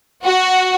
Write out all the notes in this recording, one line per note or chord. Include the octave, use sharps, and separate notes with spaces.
F#4